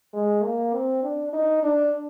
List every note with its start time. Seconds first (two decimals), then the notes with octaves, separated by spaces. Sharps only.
0.14 G#3
0.43 A#3
0.73 C4
1.03 D4
1.33 D#4
1.63 D4